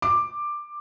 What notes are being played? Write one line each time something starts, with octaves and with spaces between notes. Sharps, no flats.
D6